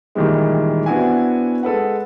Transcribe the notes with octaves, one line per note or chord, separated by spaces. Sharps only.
A#2 D#3 E3 G3 G#3
B3 C4 D4 E4 F#4 G#5
G#3 A4 B4 F#5